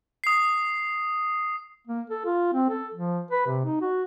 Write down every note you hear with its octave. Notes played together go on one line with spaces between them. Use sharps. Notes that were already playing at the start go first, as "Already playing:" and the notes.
D#6 C7
A#3
A4
F4
C4
A4
F3
B4
C3
D#4
F#4